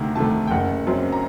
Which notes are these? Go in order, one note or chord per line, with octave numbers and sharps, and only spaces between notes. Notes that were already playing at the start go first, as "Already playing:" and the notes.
Already playing: D2 C3 D#3 A3 A#5
C3 D#3 A3 A5
G5
F#1 F#5
F#2 F#3 C4
A#5